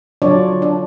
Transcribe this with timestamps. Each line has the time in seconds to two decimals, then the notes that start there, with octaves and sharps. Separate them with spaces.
0.22 D3 F#3 D4 F4 C#5 D5
0.62 D4